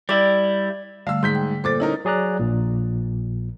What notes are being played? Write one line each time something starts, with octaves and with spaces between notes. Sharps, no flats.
G3 E4 D5
D3 G3 A3 F5 E6
G#2 C6 G6 B6
G5
A#2 A4 C5 D6 A6
C#4 D#4 E4 A#4
F#3 G#4 D5 A#5 F#6
A#1 A#2